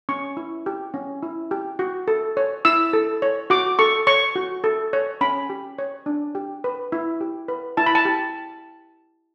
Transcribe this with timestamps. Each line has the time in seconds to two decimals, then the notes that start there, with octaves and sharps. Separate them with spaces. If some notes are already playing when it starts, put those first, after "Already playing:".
0.09 C#4 C#6
0.37 E4
0.66 G4
0.94 C#4
1.23 E4
1.51 G4
1.79 F#4
2.08 A4
2.37 C#5
2.65 E4 E6
2.93 A4
3.22 C#5
3.50 F#4 D6
3.79 A4 C#6
4.07 C#5 C#6
4.36 F#4
4.64 A4
4.93 C#5
5.21 C#4 B5
5.50 G4
5.79 C#5
6.06 D4
6.35 G4
6.64 B4
6.92 E4
7.21 G4
7.48 B4
7.77 E4 A5
7.86 B5
7.95 A5
8.05 G4